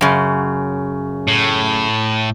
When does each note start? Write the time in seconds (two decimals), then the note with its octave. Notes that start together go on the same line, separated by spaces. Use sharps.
0.01 F#2 C#3
1.28 A2